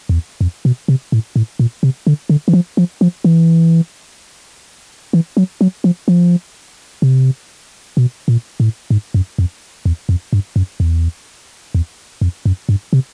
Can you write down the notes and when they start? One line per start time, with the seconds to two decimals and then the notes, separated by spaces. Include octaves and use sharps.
0.09 E2
0.41 F2
0.65 B2
0.88 C3
1.12 A2
1.36 A2
1.59 A#2
1.83 C3
2.07 D3
2.29 D3
2.48 E3
2.53 F3
2.77 F3
3.01 F3
3.24 E3
5.13 E3
5.37 F#3
5.61 F#3
5.84 F3
6.08 F3
7.02 C3
7.97 B2
8.28 A#2
8.60 A2
8.90 G#2
9.14 F#2
9.38 F2
9.85 E2
10.09 F2
10.33 G2
10.56 F#2
10.80 E2
11.75 E2
12.21 F2
12.45 F#2
12.69 G2
12.93 C3